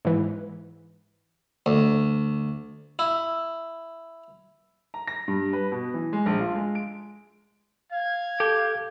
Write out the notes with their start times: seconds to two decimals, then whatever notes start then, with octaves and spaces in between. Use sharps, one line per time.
0.05 G#2 E3
1.66 D2
2.99 E4
4.94 A#5
5.07 A#6
5.28 G2
5.53 B4
5.72 B2
5.94 E3
6.13 G#3
6.26 A#1
6.40 F4
6.55 G#3
6.75 D7
7.92 F5 G#6
8.40 G4 A4